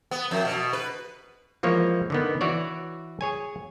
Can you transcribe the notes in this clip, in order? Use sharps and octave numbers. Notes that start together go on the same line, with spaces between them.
B3
F2
B2
B4
E3 F3 G#3 A#3 C#5
D3 D#3 B3
E3 F#4 C#5 D5
G#4 C#5 G#5